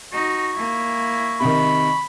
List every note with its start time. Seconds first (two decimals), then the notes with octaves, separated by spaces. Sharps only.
0.12 D#4 F#4 C#6
0.54 A#3 E4
1.40 C3 D#3 B5